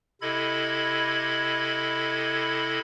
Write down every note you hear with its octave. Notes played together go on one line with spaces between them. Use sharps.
C3 E4 A4 D#5 B5 G#6